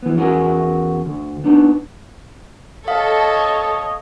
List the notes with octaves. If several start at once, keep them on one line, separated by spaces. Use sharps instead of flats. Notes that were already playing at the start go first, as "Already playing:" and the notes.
E3 B3
E2 C#4 F#4 A#4 G#5
D2
B3 D4 D#4
A4 C#5 D#5 F5 D#6